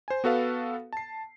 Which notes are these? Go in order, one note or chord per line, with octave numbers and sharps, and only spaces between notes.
C5 G#5
B3 F#4 A4 B4 F5
A5 C7